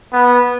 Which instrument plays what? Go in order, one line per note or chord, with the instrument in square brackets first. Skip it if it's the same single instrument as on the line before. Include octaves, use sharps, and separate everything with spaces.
[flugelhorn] B3